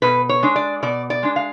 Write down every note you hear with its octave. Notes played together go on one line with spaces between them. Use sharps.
B2 B4
C#5
G#3 D4
D5
B2 D5
D5
G#3 D4
F5